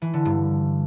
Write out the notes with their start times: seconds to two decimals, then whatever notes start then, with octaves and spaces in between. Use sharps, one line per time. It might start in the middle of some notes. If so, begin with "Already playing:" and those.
0.02 E3
0.13 D3
0.25 G2